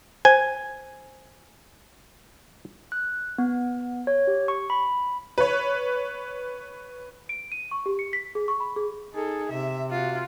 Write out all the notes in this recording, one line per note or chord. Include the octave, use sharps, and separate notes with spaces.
C5 G#5
F#6
B3
C#5
G4
C#6
B5
B4 C#5
D7
D#7
C#6
G4
C#7
B6
G#4
C#6
B5
G#4
D#4 G#4 A4
C3 E5
F4 F#4